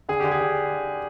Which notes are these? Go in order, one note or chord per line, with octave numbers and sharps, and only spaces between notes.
D3 G#4
D3 G4
G#4
D3